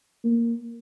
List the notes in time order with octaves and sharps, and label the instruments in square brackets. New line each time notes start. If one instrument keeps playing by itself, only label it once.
[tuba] A#3